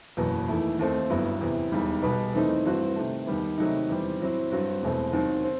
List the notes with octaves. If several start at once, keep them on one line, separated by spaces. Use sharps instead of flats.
F#1 E2 B2 F#3 B3
E2 D#3 A3 E4
D#2 D#3 A3 C4
G1 G2 F#3 B3 E4
E2 C3 E3
E1 D#2 D#3 G3
B1 B2 G3 B3
E2 D#3 A3 C4 D#4
G2 E3 A3 C4 F#4
C3 D#3 A3
D#2 D#3 G3 B3
C3 D#3 F#3 A3 D#4
E2 D#3 G3 C4
A2 F#3 C4 E4
G2 F#3 C4 F#4
E1 E2 B2 A3 C4
D#2 D#3 F#3 C4
C4